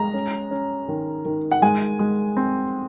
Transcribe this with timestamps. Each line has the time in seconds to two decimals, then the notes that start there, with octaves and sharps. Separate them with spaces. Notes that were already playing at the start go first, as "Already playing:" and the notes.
Already playing: G#3 A#5
0.14 C#4
0.51 C#4
0.88 D#3
1.25 D#3
1.51 F#5
1.62 G#3 G#5
1.99 G#3
2.37 C4